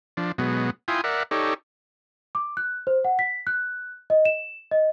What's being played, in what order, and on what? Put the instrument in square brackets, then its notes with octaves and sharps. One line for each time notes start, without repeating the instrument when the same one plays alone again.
[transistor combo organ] F3 D4
B2 F#3 G#3 B3
E4 F4 G5 G#5 C6 D#6
A#4 D5 E5 F#5
D#4 G4 A4 C#5 D5
[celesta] D6
F#6
C5
F#5
B6
F#6
D#5
E7
D#5